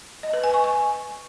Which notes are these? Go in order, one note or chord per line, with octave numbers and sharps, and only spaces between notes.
D#5
B4
G#5
C#6
G#5